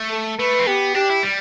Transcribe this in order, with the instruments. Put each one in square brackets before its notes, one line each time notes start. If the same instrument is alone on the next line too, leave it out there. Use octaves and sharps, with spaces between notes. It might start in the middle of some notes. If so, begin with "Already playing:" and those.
Already playing: [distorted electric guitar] A3
[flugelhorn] A4
[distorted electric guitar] A3 [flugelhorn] B4
[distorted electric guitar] C4
[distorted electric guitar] B3 [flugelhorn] G4
[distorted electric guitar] D4 [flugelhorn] G4
[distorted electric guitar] E4
G3